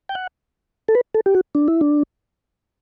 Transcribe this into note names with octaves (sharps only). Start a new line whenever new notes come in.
G5
F#5
A4
B4
A4
G4
F#4
D4
E4
D4